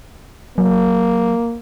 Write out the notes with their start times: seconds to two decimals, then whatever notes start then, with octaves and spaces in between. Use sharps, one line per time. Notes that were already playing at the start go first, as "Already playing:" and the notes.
0.58 F#3 A#3